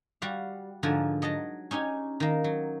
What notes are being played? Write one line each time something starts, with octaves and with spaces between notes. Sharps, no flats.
G3 F#4 F5
G#2 D3 F3 A#4 G#5
F#3 D#5 A5 A#5
C#4 D#4 G4 G#5
D#3 A#3
F#3